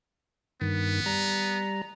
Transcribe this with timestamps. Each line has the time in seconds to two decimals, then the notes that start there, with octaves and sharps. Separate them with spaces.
0.61 G2 D#3 B3
1.06 G3 A#5